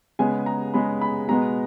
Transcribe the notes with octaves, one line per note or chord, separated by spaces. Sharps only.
C#3 G#3 B3 G#5
A#5
C#3 G#3 B3 B5
B5
B2 G#3 B3 A#5